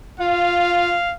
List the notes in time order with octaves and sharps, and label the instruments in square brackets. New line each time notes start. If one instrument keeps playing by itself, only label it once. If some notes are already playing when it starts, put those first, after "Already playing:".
[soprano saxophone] F4 [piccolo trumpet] F5